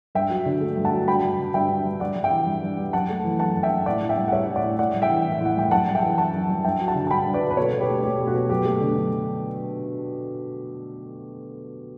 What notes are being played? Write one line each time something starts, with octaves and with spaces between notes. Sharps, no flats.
G2 E5 G5
F#3
D3
A3
G2
F#5 A5
F#3
G2 G5 B5
G3
D3
G2 E5 G5
G2
G3
G2 D5 F#5
G3
E5 G5
E3
G2
G2
G3
F#2 F#5 A5
A3
E3
F#2 F#5 A5
F#2
E5 G5
A3
A2 D5 F#5
A2
E5 G5
G3
F#5
G3 C#5 E5
A2
D5 F#5
A2
A2 D5 F#5
G3
E5 G5
E3
A2
E5
A2 F#5
G3 G5
F#2 F#5 A5
G3
E5 G5
E3
F#2 F#5 A5
F#2
G3
G2 E5 G5
F#3
F#5 A5
D3
A5
G2 G5 B5
G2
B4 D5
F#3
B4
B2 A4 C#5
B2
G4 B4
A3
A3 G4
B2
F#4
B2
F#2 G4
A3
D3
F#2